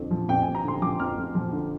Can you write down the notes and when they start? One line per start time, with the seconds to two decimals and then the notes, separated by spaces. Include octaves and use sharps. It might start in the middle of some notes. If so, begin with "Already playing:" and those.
Already playing: F2 D3
0.11 F3
0.28 F2 G5
0.42 G#5
0.46 F2
0.55 A#5
0.64 D3 C6
0.82 F3 D6
1.00 F2 F6
1.18 F2
1.35 F3
1.53 D3